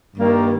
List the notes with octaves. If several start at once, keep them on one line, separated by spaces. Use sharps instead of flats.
G2 D#3 G3 A#3